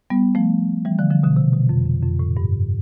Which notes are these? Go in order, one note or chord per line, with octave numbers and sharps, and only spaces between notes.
G3 B3
F3 A3
E3 G3
D3 F3
D3 F3
B2 D3
C3
B2
F2
F2
F2
A2
G2